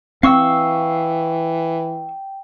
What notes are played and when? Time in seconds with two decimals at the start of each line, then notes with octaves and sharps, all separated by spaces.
0.23 E3 C4 F5 G5 C#6 E6